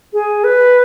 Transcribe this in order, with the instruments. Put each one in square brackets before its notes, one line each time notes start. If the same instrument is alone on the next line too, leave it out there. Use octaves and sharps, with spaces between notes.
[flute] G#4
B4